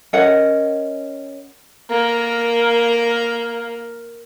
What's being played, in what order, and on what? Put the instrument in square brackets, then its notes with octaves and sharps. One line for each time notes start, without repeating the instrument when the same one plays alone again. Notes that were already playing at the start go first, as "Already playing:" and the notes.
[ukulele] C#4 A#4 D#5 F#5
[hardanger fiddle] A#3 A#4